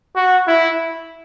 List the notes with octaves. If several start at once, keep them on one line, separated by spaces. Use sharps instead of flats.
F#4
E4